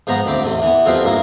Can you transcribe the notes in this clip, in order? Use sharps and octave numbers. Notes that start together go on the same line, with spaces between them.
G#2 F3 B3 A#5
D2 C4 B5 D6
A1 E2
E3 B3
C2 F2 B2 C4 F4 B4
G2 A#3 E4